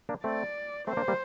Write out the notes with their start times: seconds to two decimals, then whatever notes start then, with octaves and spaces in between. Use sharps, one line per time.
0.09 A#3 D4
0.24 A3 C4 D5
0.87 A3 C4 C5
0.97 A#3 D4
1.08 G3 A#3